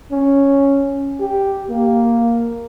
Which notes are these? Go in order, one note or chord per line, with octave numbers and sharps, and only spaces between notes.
C#4
G4
A#3